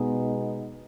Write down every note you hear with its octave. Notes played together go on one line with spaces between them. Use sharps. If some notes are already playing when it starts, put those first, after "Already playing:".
Already playing: B2 G#3 B3 D#4